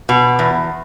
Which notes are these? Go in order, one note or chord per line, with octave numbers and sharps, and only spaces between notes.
B2
E2